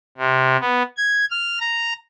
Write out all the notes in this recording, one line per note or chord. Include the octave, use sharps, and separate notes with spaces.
C3
B3
G#6
F6
A#5